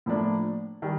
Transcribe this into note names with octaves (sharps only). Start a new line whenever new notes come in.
A2 F3 A#3 D4
D#3 G3